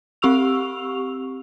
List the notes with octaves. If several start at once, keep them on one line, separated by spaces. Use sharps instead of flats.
C4 G4 C#6 E6 F7